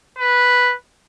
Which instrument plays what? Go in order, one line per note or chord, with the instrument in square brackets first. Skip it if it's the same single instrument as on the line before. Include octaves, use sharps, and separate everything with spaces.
[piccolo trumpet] B4